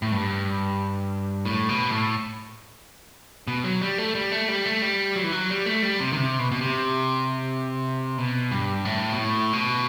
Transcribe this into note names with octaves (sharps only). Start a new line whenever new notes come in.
A2
G2
A2
B2
A2
B2
F#3
G3
A3
G3
A3
G3
A3
G3
F#3
E3
F#3
G3
A3
G3
C3
D#3
C3
B2
B2
C3
B2
G2
A2
B2
A2
B2